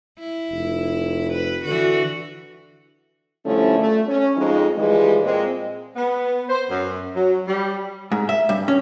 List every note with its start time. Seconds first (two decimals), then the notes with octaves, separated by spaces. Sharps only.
0.19 E4
0.51 F1
1.33 B4
1.65 D3 E3 F#4
3.45 D3 F3 G3 A3 C#4 E4
3.78 A3
4.08 C#4
4.37 F2 G#3 D#4
4.77 E3 F3 G3 G#3
5.22 A#2 G#3 C4
5.96 B3
6.49 C5
6.70 F#2
7.16 F#3
7.48 G3
8.12 G#2
8.29 E5
8.49 G2
8.68 C#4